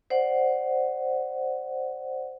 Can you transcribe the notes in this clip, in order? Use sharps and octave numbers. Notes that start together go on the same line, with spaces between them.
C5 D5 F#5